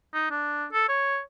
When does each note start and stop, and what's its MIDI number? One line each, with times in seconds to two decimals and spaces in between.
0.14 0.29 63
0.31 0.66 62
0.73 0.87 69
0.89 1.19 73